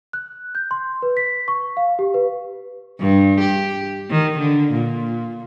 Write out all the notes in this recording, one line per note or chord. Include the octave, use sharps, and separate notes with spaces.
F#6
G6
C6
B4
B6
C#6
F5
G4
B4
G2
G4
D#3
D3
A#2